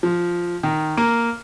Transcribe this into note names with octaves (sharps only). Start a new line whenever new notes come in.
F3
D#3
A#3